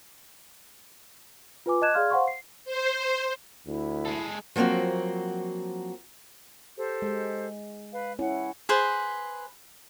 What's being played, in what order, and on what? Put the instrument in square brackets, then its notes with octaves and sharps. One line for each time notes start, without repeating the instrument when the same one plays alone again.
[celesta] F4 B4 G#5 D6
D#5 A5 D6 F#6 G#6 E7
G#4 D5 F5 C6 F6 G#6
C5 F5 F#5 A5 C6 C#6
C7
[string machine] C5
[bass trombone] D2 [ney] E4
[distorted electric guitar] G#3 A4
[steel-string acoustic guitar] F3 F#3 A#3 C4 F#4
[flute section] G4 A4 C5
[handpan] G#3
[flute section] B4 F5
[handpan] C#4 E4 [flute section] F#5
[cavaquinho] G#4 B4 C5